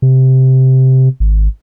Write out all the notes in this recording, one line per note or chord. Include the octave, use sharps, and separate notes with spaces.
C3
G#1